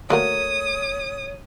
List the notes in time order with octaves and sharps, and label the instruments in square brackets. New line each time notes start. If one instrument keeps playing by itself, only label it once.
[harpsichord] D3 A#3 [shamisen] A3 F#4 A#4 [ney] C#5 [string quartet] D#6